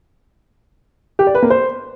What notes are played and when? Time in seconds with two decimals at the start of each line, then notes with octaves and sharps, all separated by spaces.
1.19 G4
1.27 D5
1.35 B4
1.43 A#3
1.50 C5